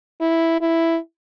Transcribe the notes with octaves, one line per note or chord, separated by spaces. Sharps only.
E4
E4